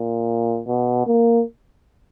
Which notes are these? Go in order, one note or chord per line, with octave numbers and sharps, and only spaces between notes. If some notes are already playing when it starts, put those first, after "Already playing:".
Already playing: A#2
B2
A#3